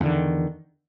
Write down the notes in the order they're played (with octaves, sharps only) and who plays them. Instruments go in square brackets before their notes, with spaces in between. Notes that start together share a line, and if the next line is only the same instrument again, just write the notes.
[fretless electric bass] E2
D3
D#3